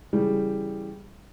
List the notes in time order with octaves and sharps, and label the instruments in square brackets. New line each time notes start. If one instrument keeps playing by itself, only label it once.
[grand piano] C#3 E3 G3